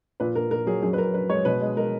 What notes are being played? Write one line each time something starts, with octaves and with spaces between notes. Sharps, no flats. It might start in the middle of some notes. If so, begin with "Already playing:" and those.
A#2 B4
A#2 A#4
A#2 A#4
F#3 G#4
F#2 G#4
B4
F#2 A#4
F#2 B4
G#3 C#5
B2 B4
G#3
G#3 A#4